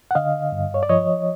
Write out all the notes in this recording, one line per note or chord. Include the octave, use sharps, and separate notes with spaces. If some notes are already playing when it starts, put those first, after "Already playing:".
F#5
D3 D#5 F5
G2
C#5
D5
F3 C#5 D#5